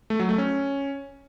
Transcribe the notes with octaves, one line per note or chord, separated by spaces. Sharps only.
A3
F#3
A3
C#4